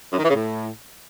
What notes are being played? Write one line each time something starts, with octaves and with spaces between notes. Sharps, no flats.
F#2
D#3
E3
C#3
A2